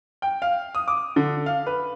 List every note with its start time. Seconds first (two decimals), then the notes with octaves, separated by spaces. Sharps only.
0.22 G5
0.42 F5
0.75 D#6
0.88 D6
1.16 D3
1.46 F5
1.67 B4